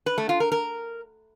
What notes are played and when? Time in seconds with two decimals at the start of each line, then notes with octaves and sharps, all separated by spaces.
0.06 B4
0.18 A3
0.29 F4
0.40 A#4
0.52 A#4